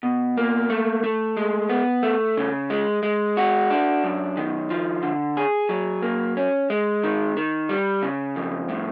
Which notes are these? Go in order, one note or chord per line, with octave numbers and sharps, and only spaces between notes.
B2
A#3
A3
A3
G#3
B3
A3
C#3
G#3
G#3
F#4
D4
F#2
D#3
F3
D3
G#4
F#3
A#3
C#4
G#3
D#3
D#3
G3
C#3
F2
A2